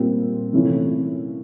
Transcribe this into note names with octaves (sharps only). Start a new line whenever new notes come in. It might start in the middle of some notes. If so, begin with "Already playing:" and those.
Already playing: A#2 G3 C4 F4
C3 E3 A3 C#4 F4